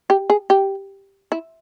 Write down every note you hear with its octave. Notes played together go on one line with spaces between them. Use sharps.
G4
G#4
G4
E4